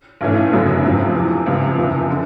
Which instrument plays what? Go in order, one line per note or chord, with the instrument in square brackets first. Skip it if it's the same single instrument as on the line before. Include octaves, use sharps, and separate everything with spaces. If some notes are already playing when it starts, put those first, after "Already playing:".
[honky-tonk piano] B1 A2 E3 A3 C#4
F#1 F#2 D3 F#3 B3
F2 C3 F3
E2 C3 E3
C#2 C3 F3
F#1 E2 C3 F3
D3